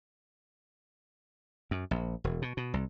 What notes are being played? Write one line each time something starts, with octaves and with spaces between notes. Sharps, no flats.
F#2
A#1
E1
B2
B2
C2